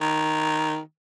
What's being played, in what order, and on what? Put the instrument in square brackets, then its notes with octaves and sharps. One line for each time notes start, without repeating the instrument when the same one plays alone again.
[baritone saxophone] D#3